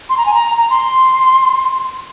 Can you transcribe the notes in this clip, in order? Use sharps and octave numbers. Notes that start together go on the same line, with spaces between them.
C6
A#5
G#5
A#5
A#5
C6